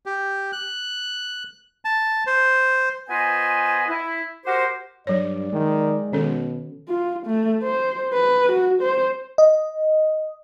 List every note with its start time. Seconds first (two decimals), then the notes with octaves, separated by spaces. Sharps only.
0.06 G4
0.53 F#6
1.85 A5
2.27 C5
3.09 B3 F4 B4 C5 D#5 G#5
3.89 E4
4.46 F#4 G4 A#4 C5
5.07 G2 F#3 C#5 D5
5.52 D#3 G#3
6.13 B2 D#3 C#4 A4
6.88 F4
7.26 A3
7.63 C5
8.13 B4
8.52 F#4
8.82 C5
9.38 D#5